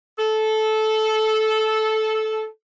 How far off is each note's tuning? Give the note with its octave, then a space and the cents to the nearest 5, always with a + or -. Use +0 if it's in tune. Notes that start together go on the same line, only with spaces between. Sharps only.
A4 -15